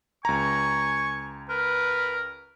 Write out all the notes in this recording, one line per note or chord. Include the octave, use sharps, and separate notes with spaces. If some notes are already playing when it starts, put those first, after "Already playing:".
C#2 G#5 A#5 C#6
A#4 B4